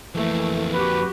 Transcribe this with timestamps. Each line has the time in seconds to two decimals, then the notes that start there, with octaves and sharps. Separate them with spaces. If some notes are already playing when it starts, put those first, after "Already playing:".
0.15 F2 E3 A3 A#3
0.74 F#4 G4 B4